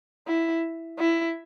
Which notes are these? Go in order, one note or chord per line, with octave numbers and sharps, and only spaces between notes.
E4
E4